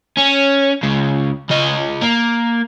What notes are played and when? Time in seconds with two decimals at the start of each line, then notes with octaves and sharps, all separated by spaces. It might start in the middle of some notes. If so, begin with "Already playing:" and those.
0.18 C#4
0.83 C#2 C#3
1.50 C#3 D#5
2.01 A#3